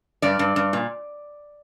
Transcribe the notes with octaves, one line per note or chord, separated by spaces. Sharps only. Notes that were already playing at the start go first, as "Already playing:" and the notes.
G2 D5
G2
G2
A#2